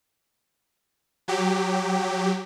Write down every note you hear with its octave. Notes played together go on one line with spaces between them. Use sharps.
F#3 G4